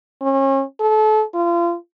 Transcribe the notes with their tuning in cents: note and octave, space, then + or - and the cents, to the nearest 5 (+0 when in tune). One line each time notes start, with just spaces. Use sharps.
C#4 -35
A4 -30
F4 -30